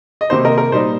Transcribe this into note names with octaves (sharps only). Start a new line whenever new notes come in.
D#5
C3 D#3 A#3 D#4 C5
A#4 D#5
A#4
A#2 G3 D#4 C5